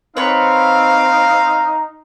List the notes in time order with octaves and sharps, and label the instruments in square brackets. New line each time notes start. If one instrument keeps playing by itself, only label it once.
[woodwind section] C4 [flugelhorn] D#4 [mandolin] B4 C#5 [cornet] F5